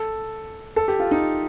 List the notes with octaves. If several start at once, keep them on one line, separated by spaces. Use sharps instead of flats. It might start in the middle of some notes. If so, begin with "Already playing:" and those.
Already playing: A4
A4
G4
F4
D#4